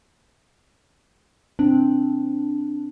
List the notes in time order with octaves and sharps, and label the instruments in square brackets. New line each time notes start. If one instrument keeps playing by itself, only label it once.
[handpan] C4 [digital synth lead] D4